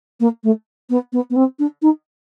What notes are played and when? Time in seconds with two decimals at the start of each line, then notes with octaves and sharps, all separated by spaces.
0.20 A#3
0.44 A3
0.90 B3
1.13 B3
1.30 B3
1.36 C4
1.59 D4
1.82 D#4